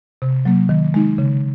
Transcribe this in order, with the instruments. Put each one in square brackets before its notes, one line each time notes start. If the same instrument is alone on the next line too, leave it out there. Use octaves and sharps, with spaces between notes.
[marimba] C3
F#3 A#3
D#3
G#3 D#4
C#3